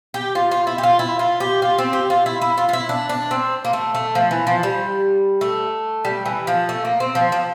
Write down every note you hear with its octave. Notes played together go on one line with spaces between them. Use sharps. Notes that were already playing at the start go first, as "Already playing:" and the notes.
G4
F4
F4
E4
G4
F4
E4
F4
G4
F4
C4
G4
F4
E4
E4
F4
F4
E4
D4
D4
C4
A#3
A3
A3
F3
E3
F3
G3
A3
G3
E3
F3
A3
A#3
C4
F3
F3